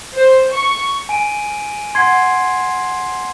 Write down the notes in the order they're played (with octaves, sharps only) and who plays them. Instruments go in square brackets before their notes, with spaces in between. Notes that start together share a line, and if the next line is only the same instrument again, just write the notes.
[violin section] C5
C#6
[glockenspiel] G#5 D7 D#7
[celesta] F#5 G#6 [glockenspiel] C6 C7